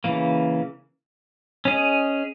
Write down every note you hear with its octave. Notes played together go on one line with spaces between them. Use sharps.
C#3 E3 A#3
C#4 G#4 D#5